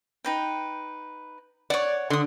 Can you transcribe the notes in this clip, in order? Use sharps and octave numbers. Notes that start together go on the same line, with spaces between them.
D#4 B4 G5
C#5 D5 F#5
D3 C6 D#6